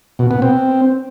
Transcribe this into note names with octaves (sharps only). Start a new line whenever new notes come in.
B2
B3
C4